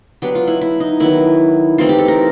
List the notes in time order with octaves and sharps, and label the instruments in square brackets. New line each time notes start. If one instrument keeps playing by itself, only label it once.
[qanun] F#3 B3 D4 G4
F4
E4
E4
D#4
D#3 F#3 B3 E4
E3 A3 C4 D#4 F4
G4
A4
A#4